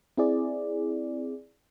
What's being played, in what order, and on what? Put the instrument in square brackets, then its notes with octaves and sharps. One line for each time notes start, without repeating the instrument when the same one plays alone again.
[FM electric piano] C4 E4 G#4 D5